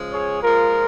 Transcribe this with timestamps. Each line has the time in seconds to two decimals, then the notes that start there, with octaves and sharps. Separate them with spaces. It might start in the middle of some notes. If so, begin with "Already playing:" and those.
Already playing: C#3 F3 G#3
0.12 G#4 C#5
0.43 A#2 F3 G#3 F4 A#4